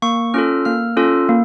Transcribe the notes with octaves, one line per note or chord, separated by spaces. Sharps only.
A#3 C#6
C#4 F4 A4 F6
A#3 F6
C#4 F4 A4
A#3